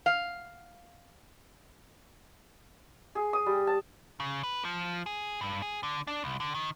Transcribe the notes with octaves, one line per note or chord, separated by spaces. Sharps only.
F5
G#4
D#6
G3
A5
C#3
B4
F3
G#4
G2
G#4
D3
D4
C2
D3
D#3